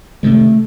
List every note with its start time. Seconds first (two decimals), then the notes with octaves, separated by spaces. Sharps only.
0.23 C3 D#3 G#3 A3